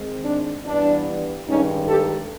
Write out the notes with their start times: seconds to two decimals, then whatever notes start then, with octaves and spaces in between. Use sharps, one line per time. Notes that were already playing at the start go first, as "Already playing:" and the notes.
Already playing: G#2 D#3 G#3 C4
0.25 D4
0.66 G2 E3 G3 B3 D4
1.48 G2 D#3 G#3 C#4 D#4
1.88 G4 A4